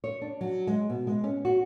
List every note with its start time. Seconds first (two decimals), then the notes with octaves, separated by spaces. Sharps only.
0.04 C#5
0.22 D4
0.41 F#3
0.67 G#3
0.90 B2
1.07 G#3
1.24 C#4
1.45 F#4